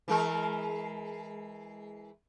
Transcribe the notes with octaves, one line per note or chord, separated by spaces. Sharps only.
E3 G#3 A#4